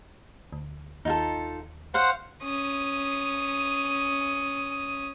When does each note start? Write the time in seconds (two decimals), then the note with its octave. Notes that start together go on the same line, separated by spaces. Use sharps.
0.52 D2
1.05 D#2 D#4 F4 A4
1.94 C5 C#5 F5 F#5 C6
2.43 C#4 D#6